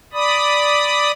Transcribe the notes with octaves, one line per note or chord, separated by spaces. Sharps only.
D5 B5 D#6